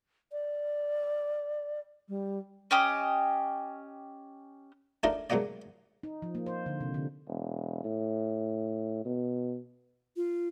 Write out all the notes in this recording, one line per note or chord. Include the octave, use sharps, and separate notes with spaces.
D5
G3
C#4 G4 D#5
A3 D4 D#4 F4 A#4 D5
A1 A#2 F#3 G#3 A#3 D5
D#4
F3
A#3
C5
D3
C3
D3
E1
A2
B2
F4